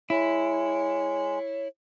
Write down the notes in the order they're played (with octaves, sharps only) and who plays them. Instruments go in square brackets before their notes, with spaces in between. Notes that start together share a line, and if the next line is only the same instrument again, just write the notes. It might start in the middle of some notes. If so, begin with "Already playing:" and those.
[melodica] G#3 [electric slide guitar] E4 [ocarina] C#5